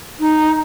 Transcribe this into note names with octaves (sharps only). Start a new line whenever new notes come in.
D#4